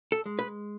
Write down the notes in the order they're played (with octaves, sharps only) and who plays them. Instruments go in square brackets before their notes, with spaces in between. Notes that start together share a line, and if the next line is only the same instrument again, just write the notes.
[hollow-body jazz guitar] A4
G#3
B4